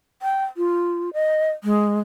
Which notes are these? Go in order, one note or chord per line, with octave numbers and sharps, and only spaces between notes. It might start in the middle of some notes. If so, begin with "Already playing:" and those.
G5
F4
D#5
G#3